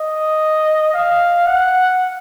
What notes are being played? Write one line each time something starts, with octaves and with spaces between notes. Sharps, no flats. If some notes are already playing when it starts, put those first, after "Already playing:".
Already playing: D#5
F5
F#5